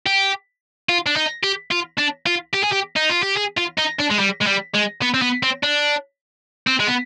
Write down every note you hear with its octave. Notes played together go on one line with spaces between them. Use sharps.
G4
F4
D4
D#4
G4
F4
D4
F4
G4
G#4
G4
D#4
F4
G4
G#4
F4
D#4
D4
G#3
G3
G#3
G3
G#3
B3
C4
B3
C4
D4
C4
G#3
B3